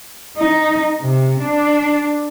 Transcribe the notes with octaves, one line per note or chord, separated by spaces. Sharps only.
D#4
C3
D4